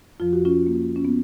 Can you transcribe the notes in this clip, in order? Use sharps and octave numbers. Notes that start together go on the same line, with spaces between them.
F2 F3 F4
F#4
C#4 F4
A#3
C#4
B3